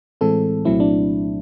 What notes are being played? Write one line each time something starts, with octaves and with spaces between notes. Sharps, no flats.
A2 E3 G#3 C4 A4
C2 A#2 F#3 A3 C4 E4
D4